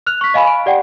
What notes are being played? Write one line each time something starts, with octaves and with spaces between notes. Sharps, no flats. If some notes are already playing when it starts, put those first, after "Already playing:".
F6 F#6 F7
C#6 B6
D#5 F5 G#5 B5
D7
G4 D5 F#5 G5